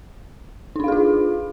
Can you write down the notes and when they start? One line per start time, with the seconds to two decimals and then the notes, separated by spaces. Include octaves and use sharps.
0.76 D#4
0.80 D4
0.84 F5
0.88 G#4
0.92 F4